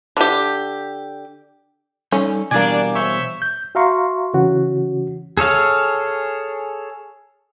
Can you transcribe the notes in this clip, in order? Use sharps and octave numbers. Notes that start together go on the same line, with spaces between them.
D3 G4
G3 C#4 D#4 A4
B2 E3 G3 A#3 D4 D5 G#5
C5 C#5 E5
G6
F#4 E5 F5 A#5 C6 C#6
C#3 E3 C#4 F#4
G#4 A4 C#5 F5